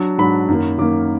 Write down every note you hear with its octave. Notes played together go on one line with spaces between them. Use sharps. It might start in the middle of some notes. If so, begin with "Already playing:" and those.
Already playing: F#3 D4
G#2 F#3 D4 B5
F#2 D#3 A#3
F#2 D#3 A#3 D6